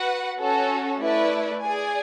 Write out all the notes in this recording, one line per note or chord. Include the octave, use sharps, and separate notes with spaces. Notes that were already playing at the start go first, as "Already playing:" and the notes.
Already playing: F#4 B4 F#5
C#4 F#4 A4
A3 E4 B4 D5
G#4 D5 G#5